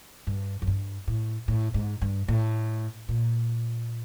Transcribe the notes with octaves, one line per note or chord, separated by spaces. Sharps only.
G2
F#2
G2
A2
A2
G#2
G2
A2
A#2